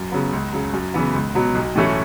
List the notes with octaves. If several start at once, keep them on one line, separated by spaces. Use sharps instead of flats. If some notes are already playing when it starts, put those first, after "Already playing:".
Already playing: F#2
C#3 F#3 B3
C#2
C#3 F#3
F#2
C#3 E3 B3
C#2
B2 F#3 B3
B1
A2 E3 A3 C#4